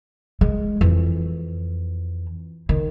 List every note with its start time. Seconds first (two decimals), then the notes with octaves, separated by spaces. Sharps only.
0.41 G#3
0.81 F2 E3
2.69 D#3